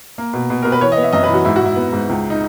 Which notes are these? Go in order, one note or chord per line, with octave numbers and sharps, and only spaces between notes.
A#3
B2
B2
B2 A#4
B4
E3 C#5
D#5
B3
E5
F#2 D#5
B4
E3
F#4
G#2 E4
G#2 F#4
E4
B3
G#2
C#2
D#4